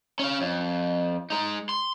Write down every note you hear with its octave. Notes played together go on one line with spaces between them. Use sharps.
C#4 F5
F2
G#3 D#4
C6